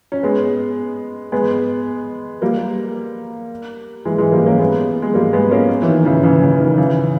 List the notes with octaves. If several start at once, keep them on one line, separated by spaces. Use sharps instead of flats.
C#4
G#3 B3
G#3 B3
G3 A#3
E3 G#3
E3 G#3
G3 A#3
A#3 C#4
G#3 B3
G#3
G3 A#3
G#3 B3
A#3 C#4
E3
D#3
C#3 E3
C#3 E3
C#3 E3
D#3
C#3 E3